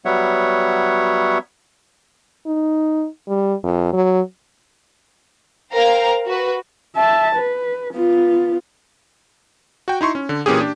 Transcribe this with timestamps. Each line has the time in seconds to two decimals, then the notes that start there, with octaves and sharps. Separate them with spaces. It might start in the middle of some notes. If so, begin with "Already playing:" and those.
0.05 F#3 G3 B3 C#5 E5 F#5
2.46 D#4
3.28 G3
3.64 F2
3.93 F#3
5.73 A#4 C5 F5 G5 A#5
6.27 F#4 B4
6.96 E5 A5
7.36 B4
7.94 B3 F4
9.88 F#4 G5
10.01 D#4 E4 C6 C#6
10.15 C#4
10.29 D3
10.46 A#2 E3 A#3 C#4 G4 G#4
10.60 D4 G4